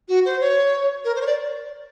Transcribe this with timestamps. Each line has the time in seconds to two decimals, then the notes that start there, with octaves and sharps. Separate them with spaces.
0.09 F#4
0.25 C5
0.41 C#5
1.05 A#4
1.16 C5
1.22 C#5
1.27 D5